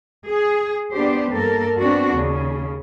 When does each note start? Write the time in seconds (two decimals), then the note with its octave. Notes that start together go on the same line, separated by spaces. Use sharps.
0.28 G#4
0.92 B3 D4 G4 C5
1.32 G2 A#3 A4 A#4
1.79 B3 C4 D4 F#4
2.15 D#2 C#3